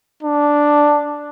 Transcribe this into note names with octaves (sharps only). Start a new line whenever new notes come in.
D4